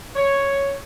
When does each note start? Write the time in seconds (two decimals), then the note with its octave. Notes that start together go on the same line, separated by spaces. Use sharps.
0.16 C#5